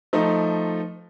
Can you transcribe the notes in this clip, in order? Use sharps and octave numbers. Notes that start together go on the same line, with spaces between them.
F3 A3 D#4